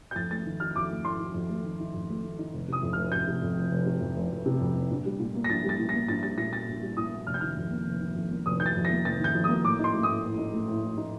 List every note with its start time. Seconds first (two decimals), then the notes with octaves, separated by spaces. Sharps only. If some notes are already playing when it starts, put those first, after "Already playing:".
0.11 G6
0.16 F2 A6
0.30 A3 A6
0.46 D#3
0.60 D#4 F6
0.75 F2 D6
0.90 A3
1.04 D#3 C6
1.19 D#4
1.34 F2
1.49 A3
1.65 D#3
1.79 D#4
1.94 F2
2.09 A3
2.23 D#3
2.39 D#4
2.53 F1
2.68 C3 D#6
2.83 F2
2.93 F1 F6
3.12 F1 G6
3.27 C3
3.42 F2
3.56 F1
3.71 F1
3.86 C3
4.01 F2
4.16 F1
4.31 F1
4.46 C3
4.60 F2
4.75 F1
4.90 A#1
5.05 G3
5.19 A#2
5.35 A#3
5.44 A#6
5.49 A#1 A6
5.64 G3
5.69 A6
5.79 A#2
5.89 A#3 A#6
6.08 A#1 A6
6.23 G3 A6
6.37 A#2 A#6
6.53 A#3 A6
6.68 A#1
6.82 G3
6.97 A#2 D#6
7.12 A#3
7.27 F1 F6
7.34 G6
7.41 D#3 F6
7.56 F2
7.71 A#3
7.87 F1
8.01 D#3
8.16 F2
8.31 A#3
8.46 F1 D#6
8.60 D#3 G6
8.66 A6
8.75 F2
8.85 A#6
8.90 A#3
9.05 F1 A6
9.19 D#3 G6
9.35 F2
9.44 A#3 D#6
9.64 A2 D6
9.79 D#4 C6
9.94 A3
10.03 A2 D#6
10.23 A2
10.38 D#4
10.52 A3
10.68 A2
10.83 A2
10.98 D#4